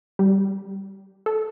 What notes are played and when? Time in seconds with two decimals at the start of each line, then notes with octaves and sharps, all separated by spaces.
0.19 G3
1.26 A4